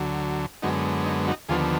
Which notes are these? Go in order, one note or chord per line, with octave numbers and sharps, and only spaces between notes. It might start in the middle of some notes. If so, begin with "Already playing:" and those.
Already playing: D2 D3 F#3
F#2 D3 G#3 B3 D#4 F#4
D#4
D#4 F#4
D#2 D3 F3 B3 F4 G#4